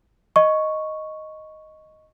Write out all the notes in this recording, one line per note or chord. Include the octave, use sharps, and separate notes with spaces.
D#5 C#6